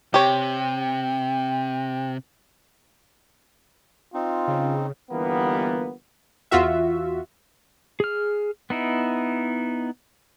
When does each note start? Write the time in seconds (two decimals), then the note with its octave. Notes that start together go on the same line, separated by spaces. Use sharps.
0.14 C3 G4 C#5 G5
4.14 C4 D#4 F4
4.48 C#3
5.11 G1 E3 G3 A#3 B3
6.51 E2 F4 F#4 E5
8.00 G#4 F6
8.70 B3 D#4 E4